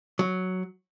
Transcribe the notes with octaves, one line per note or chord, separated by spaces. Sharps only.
F#3